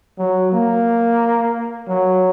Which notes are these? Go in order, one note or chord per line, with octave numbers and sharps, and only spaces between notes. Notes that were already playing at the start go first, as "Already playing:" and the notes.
F#3
A#3
F#3